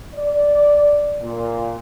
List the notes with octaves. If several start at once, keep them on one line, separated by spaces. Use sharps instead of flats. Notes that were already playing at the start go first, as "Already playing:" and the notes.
D5
A#2